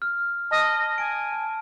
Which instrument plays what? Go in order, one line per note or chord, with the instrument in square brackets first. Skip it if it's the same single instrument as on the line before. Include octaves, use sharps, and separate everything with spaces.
[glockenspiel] F6
[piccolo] D#5 [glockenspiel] A5 F6
[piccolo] G#5 [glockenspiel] D7
[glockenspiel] A5